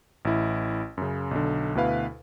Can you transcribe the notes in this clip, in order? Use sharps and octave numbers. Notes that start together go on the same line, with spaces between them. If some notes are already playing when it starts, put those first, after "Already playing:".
A1 E4
F#2 C#3
B1 D3
D2 B2 E4 B4 F5